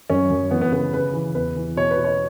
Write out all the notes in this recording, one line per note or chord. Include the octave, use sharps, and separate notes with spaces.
F#2 C#4
F#2
E3 B3
B3
C#3 B3
C#3 B4
E3
E2 B4
E3
B2 C#5
B4
B2
C#5